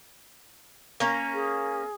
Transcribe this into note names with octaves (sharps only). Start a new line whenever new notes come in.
A#3 C#4
G#4